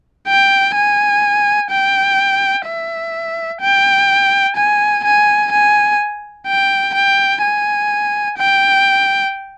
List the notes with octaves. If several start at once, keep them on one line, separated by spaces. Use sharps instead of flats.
G5
G#5
G5
E5
G5
G#5
G#5
G#5
G5
G5
G#5
G5